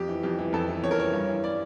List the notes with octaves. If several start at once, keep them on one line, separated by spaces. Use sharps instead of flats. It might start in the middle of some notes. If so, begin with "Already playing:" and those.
Already playing: F2 G4
E3
F2 G4
E3
F2 A4
E3
F2 C#5
A#4
E3 C#5
G2 C#5
E3
D5